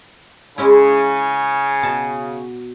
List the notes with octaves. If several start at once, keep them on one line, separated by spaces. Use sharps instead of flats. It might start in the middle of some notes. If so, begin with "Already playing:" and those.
C#3 G#3 C#4 E4
B2 F#4 A5